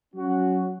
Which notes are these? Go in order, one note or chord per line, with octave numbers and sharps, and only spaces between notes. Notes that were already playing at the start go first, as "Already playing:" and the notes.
F#3 C#4 F#4